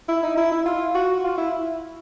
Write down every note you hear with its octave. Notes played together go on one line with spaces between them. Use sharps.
E4
D#4
E4
E4
F4
F#4
F4
E4